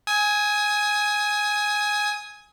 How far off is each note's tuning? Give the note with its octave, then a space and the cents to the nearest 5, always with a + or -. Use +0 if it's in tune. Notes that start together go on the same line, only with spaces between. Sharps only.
G#5 +0 D#6 +35